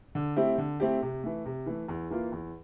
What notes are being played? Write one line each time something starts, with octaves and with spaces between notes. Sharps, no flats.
D3
A3 C4 E4 G4
D3
A3 C4 E4 G4
C3
E3 A3
C3
E3 A3
E2
E3 A#3 F4
E2